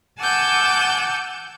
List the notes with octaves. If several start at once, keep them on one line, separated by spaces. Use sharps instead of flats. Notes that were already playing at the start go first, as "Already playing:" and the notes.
F#5 G#5 A5 D6 E6 G6